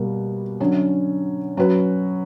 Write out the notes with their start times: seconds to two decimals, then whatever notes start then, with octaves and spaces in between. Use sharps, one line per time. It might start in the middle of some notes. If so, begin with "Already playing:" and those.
Already playing: B2 G3 A#3
0.60 D3 F#3 C#4
1.57 F#3 C#4 F#4 B4